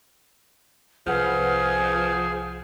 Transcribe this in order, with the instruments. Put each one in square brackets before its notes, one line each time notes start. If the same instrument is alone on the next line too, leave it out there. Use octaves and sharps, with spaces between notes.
[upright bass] C2 [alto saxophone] F3 [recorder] G#4 [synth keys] B4 F#5 F6